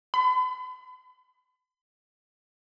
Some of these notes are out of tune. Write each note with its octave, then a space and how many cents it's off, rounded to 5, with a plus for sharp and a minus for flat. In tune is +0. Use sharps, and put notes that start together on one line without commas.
B5 +45